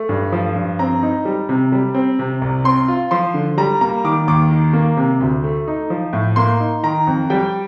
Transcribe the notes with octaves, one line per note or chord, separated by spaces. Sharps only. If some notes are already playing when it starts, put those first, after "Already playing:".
Already playing: A3
G2
F3
G2
C4 A#5
D#4
G3
C3
G3
C4
C3
C2
C4 C6
F4
F3 C6
D3
G3 A#5
A#3 A#5
D#3 D6
D#2 D6
D#3
A#3
C3
D2
A3
D#4
F3
A2
A#3 C6
D#4
D#3 A#5
F2
G3 G5